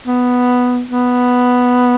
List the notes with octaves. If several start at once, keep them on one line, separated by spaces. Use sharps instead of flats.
B3
B3